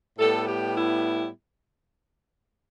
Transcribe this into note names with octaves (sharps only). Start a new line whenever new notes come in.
A2 G3 B3 A4
G4
E4